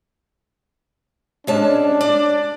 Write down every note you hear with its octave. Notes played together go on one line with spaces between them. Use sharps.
G#3 C#4 D4 A5
D5